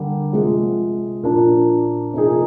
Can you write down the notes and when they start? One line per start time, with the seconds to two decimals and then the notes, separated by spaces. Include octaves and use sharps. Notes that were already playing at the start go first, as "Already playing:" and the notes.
Already playing: D3 G3 A#3
0.33 C3 F3 G#3
1.23 A#2 F3 A#3 D4
2.13 C3 F3 A#3 D#4 G#4